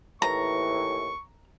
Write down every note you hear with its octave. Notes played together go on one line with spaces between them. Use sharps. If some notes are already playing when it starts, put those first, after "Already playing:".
D#2 A2 E3 A#5 C#6